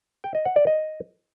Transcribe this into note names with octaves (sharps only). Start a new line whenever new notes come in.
G5
D#5
F#5
D5
D#5